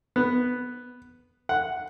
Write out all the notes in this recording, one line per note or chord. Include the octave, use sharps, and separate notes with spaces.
B3
F#5